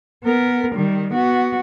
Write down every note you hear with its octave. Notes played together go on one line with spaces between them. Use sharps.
B3 A#4
D#3 G3
B3 F#4